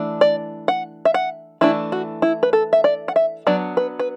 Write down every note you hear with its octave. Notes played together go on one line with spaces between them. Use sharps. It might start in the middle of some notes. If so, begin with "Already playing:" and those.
Already playing: E3 A3 D4
D5
F#5
E5
F#5
E3 A3 D4 E4
F#4
E4
B4
A4
E5
D5
F#5
E5
F#3 B3 D4 D5
B4
B4